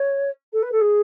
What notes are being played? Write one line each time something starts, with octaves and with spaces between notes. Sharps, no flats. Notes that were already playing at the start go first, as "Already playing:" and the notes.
Already playing: C#5
A4
B4
A4
G#4